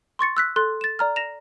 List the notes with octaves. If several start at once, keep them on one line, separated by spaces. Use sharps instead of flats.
C6 C#6 A6 C#7
E6 F#6 B6
A4 C6 F#6 A6
A6 E7
D5 A#5 F6
A#6 E7 F7